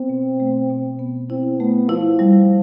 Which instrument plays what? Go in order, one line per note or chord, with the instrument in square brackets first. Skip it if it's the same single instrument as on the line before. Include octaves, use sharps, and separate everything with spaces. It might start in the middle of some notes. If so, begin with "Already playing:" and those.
Already playing: [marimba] B3 [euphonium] C4
[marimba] B2
A3
B2
B3
[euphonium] C4 [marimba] E4
[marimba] A3 [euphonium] B3
[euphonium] F3 [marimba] E4
[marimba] G3